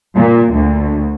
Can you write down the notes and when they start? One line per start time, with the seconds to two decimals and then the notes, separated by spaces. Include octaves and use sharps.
0.16 A#2
0.53 D2